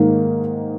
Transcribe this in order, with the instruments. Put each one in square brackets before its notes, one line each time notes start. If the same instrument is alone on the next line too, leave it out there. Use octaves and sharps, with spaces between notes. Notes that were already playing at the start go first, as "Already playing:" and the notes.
Already playing: [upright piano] G#2 D#3 A#3